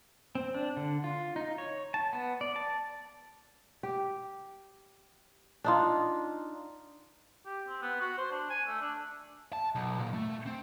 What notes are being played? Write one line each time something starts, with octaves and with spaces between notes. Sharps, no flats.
C4
D4
D3
F4
D#4
C#5
A5
B3
D5
A5
G4
D4 D#4 F4
G4
C4
B3
F#4
C5
D4
G#5
A3
D4
A5
B1
A#2
A3
C4